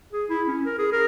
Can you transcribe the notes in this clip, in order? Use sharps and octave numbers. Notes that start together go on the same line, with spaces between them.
G#4
E4
C#4
A#4
G#4
A#4